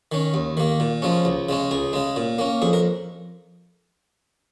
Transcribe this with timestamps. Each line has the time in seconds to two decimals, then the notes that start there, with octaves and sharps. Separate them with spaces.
0.12 D#3 C#4
0.34 D#2
0.57 D#3 A#3
0.80 A#2
1.02 F3 G#3 C#4
1.25 C#2
1.49 C#3 G#3 C#4
1.71 C#2 G#4
1.93 C#3 G#3
2.16 A#2
2.39 A#3 C#4
2.62 F2 G#4
2.73 A#4